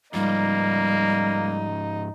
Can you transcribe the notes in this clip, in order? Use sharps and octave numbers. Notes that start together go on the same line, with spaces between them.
G#2 F3 G3 A#3 D#4